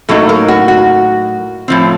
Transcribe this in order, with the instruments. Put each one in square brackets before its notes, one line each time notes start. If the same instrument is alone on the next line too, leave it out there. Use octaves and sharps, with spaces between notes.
[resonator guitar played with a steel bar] A2 F#3 A#3 D#4 A4
A#4
F#4
F#4
A2 F3 C4